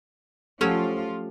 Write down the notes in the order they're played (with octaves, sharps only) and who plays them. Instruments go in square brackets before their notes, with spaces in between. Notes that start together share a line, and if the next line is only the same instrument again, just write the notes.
[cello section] F3 F4 [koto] F#3 C#4 [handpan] A3 G4 A4